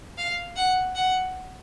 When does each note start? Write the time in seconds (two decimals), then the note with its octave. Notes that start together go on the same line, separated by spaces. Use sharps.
0.17 F5
0.56 F#5
0.95 F#5